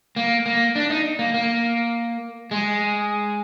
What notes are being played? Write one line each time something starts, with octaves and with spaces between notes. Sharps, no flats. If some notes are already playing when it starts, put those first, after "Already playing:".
A#3
A#3
D4
D#4
A#3
A#3
G#3